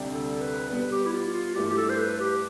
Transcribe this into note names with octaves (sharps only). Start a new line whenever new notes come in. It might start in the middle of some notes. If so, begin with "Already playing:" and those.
Already playing: D2 C3 G3 D4 G4
A4
B4
B2 G3 B3 B4
G4
E4
F4
F4
G2 E3 A3 G4
G4
A4
C5
B4
G4